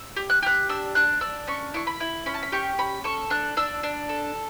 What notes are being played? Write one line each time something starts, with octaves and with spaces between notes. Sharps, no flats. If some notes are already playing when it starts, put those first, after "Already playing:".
Already playing: E6
G4
F#6
G4 F#6
D4 E6
D4 F#6
D4 E6
C#4 C#6
E4 C#6
B5
E4
C#4 B5
A5
B5
G4 C#6
C#4 B5
A4 C#6
D4 F#6
D4 E6
D4
A4